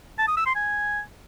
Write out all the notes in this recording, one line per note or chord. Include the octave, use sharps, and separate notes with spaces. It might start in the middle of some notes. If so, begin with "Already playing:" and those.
A5
D#6
E6
C6
G#5